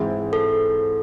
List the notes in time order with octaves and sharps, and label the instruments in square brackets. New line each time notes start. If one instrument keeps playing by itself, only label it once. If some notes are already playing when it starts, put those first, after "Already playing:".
Already playing: [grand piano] G#2 E3 G#3 C4 E4
[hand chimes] A4